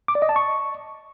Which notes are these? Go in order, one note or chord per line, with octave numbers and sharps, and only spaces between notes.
D6
D5
D#5
A5
C#6